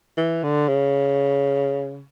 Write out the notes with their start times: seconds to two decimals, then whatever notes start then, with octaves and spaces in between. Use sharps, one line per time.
0.18 E3
0.43 D3
0.68 C#3